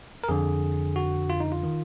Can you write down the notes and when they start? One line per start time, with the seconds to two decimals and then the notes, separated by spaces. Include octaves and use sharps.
0.24 A#4
0.29 F2 D3 G#4
0.96 F#4
1.30 F4
1.40 D#4
1.52 F4
1.63 D#3